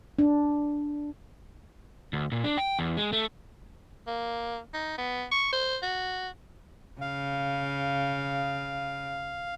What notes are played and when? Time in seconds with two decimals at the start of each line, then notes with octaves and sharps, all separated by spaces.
0.19 D4
2.13 D2
2.32 A#2
2.44 D4
2.58 G5
2.79 E2
2.97 G#3
3.13 A3
4.07 A#3
4.74 D#4
4.98 B3
5.31 C#6
5.52 C5
5.82 F#4
7.01 C#3 F5